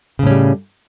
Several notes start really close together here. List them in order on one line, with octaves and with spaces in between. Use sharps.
C#3 A2 C#4 G3